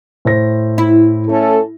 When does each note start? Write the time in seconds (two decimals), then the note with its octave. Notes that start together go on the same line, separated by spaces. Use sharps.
0.25 A2 C5 A#6
0.78 E4
1.28 A3 C#4 A4